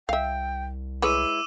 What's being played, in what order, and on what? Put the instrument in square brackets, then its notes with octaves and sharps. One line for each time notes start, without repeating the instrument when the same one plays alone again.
[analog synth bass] C2 [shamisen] E5 F5 [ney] G5
[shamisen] G#3 B4 C#5 [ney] E4 [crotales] D6 E6 D#7